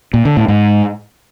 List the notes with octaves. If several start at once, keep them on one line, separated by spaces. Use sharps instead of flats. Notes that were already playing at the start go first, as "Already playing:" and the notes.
A#2
D3
A2
G#2